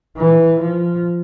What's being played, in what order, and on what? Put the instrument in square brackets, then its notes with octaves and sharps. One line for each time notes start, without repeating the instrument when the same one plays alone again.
[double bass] E3
F3